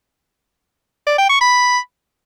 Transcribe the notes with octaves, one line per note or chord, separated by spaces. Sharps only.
D5
G5
C#6
B5